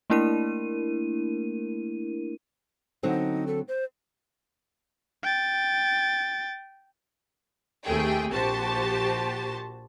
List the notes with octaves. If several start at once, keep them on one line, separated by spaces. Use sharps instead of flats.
A3 A#3 D4 E4 A#4 D#7
D3 F#3 C4 D#4
A4
C5
G5 A6
D#2 C3 A3 G#4 G5
A#1 F#4 G4 C5 A5